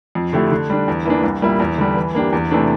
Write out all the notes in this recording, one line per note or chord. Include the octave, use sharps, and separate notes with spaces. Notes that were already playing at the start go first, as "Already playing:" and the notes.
F2
D3 A3 E4 G4
D3
G3 D4
E2
E3 A#3 D4
C2
A#2 G3 A#3 E4
E2
D3 G3
E3
A#3 D4 G4
E2
C3 E3 A3 D4